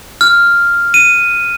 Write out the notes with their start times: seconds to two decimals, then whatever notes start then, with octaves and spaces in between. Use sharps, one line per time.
0.21 F6
0.94 D#7